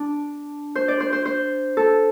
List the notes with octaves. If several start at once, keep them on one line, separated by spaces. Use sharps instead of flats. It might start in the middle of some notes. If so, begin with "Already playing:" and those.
Already playing: D4
C5
D5
C5
C5
C5
A4